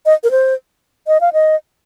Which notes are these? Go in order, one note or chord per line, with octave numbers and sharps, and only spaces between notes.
D#5
A#4
C5
D#5
F5
D#5